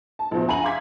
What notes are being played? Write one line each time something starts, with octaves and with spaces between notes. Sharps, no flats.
A5
A#1 E2 F3
D3 F#5 G#5 A#5 D#7 F#7
E5 F5 C6 D6 G#6 B6